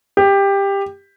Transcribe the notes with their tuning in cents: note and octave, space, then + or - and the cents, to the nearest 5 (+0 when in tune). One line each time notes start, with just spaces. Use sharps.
G4 +15